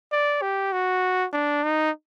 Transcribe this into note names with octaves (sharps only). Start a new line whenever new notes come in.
D5
G4
F#4
D4
D#4